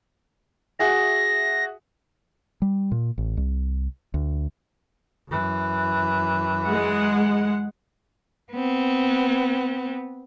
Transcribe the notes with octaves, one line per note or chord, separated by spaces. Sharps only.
F#4 G#4 E5 A#6
G3
A#2
A1
C2
D2
F#2 E3
G#3 F#5
B3 C4